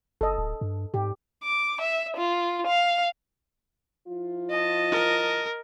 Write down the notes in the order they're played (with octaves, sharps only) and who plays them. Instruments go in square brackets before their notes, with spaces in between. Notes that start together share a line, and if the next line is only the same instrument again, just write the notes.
[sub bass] F#1 [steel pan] A4 D#5
[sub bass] D1
G2
[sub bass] G#2 [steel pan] G4
[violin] D6
E5
F4
F5
[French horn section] F3 E4 F4
[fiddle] D#5 A5
[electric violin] A#4